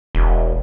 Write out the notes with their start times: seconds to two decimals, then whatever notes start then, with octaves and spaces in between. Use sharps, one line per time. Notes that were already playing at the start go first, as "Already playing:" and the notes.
0.15 E1